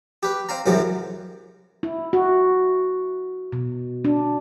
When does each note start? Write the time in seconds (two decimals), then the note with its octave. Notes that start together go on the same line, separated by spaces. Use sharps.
0.23 G4 B4
0.49 C4 F5 A#5
0.66 C2 F#2 C3 E3 F#3 G#3
1.83 E4
2.13 F#4
3.52 B2
4.05 D4